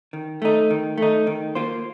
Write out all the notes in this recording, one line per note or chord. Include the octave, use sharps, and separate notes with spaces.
D#3
A3 D#4
D#3
A3 D#4
D#3
A#3 F4 C5